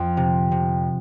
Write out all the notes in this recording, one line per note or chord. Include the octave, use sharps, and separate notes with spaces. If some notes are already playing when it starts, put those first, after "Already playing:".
Already playing: F2
C3
C3